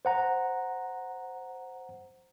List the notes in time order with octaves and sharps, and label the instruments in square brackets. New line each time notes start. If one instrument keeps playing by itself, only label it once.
[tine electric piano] C5 F#5 A#5